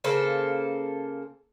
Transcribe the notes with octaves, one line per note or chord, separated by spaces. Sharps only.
C#3 A#3 A4 C5